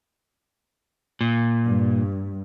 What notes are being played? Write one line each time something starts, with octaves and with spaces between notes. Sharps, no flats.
A#2
G2